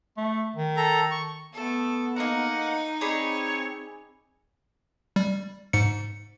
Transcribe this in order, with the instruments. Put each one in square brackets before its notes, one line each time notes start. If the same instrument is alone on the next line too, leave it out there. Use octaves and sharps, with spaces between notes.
[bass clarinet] A3
D#3
[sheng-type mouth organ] A4 A#5
C#6
[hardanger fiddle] A3 A4 [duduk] B3
[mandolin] A#3 A#4 [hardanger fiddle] D#4 D#5 [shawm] F#5
[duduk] C4 [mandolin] G#4 D5 B5 [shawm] C#5
[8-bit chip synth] G3
G#2 C#7